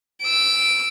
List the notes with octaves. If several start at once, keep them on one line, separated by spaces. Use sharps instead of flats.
E6 D7